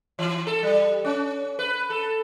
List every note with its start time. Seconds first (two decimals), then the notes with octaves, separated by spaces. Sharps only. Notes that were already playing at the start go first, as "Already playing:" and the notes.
0.19 E3
0.47 A4
0.63 G3
1.05 C#4
1.59 B4
1.90 A4